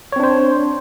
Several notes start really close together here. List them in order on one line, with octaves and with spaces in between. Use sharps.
C#5 C4 D4 C5